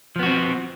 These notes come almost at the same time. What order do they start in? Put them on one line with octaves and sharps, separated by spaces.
F3 B3 F#4 C4